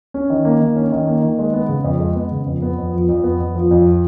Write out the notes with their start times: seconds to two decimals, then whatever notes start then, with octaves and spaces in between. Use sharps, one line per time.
0.14 C#4
0.30 D#3
0.45 A#3
0.61 D#3
0.76 C#4
0.92 D#3
1.07 A#3
1.23 D#3
1.39 G#3
1.53 B3
1.69 C#3
1.84 F2
2.00 G#3
2.16 B3
2.32 C#3
2.46 F2
2.62 B3
2.78 F2
2.93 F3
3.09 F2
3.24 B3
3.40 F2
3.55 F3
3.71 F2
3.86 F4